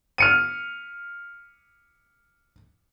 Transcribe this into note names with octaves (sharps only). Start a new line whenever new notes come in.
F6 C#7 D#7